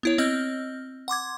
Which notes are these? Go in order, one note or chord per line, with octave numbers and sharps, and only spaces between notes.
B3 E4 C#5
C4 D#5 F6 G6
F#5 C6 D6 G#6